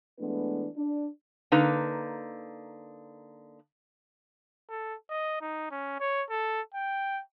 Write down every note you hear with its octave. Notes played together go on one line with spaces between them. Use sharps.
E3 G#3 A3 B3 D4 B4
D4
D3 A#3 D#4 B4 A#5
A4
D#5
D#4
C#4
C#5
A4
G5